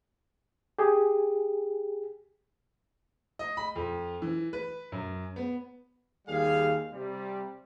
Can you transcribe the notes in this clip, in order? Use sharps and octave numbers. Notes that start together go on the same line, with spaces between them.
G4 G#4
D#5
B5
F2
E3
B4
F#2
B3
D#2 G3 G#4 F5
C3 G3